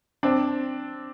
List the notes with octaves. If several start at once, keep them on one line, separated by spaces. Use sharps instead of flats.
C4 D4